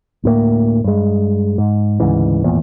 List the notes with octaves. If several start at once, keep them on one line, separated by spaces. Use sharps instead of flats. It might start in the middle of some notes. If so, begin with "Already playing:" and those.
D2 A2 A#3
G2 G#3
G#2
D2 G#2 C#3 E3
G#1 E2 A#2